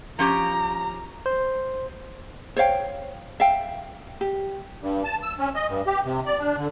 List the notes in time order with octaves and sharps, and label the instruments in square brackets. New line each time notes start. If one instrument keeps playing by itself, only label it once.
[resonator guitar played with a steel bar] F3 C#4 G4 [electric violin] A#5
[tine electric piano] C5
[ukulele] C5 C#5 F5 G5
E5 F5 G5
G4
[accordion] G2
A5
E6
C#4
D#5
G2
G4
C3
D5
D4
D3